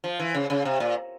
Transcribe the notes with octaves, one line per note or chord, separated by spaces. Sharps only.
F3
E3
C#3
C#3
C3
A#2